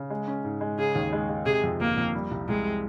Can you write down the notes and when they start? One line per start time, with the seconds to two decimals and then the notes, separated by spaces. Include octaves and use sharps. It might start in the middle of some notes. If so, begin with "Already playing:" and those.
Already playing: C#3
0.10 G#3
0.28 C#4
0.45 G#2
0.61 G#3
0.78 C#3 G#4
0.95 D#2
1.13 G#3
1.29 G#3
1.46 C3 G#4
1.63 F2
1.80 G1 A#3
1.97 F2
2.14 G3
2.31 C2
2.48 C2 G#3